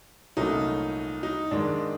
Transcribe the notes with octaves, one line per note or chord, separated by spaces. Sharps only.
C2 A#2 F#3 A3 C#4 D#4
D#4
G#2 D#3 G#3 D4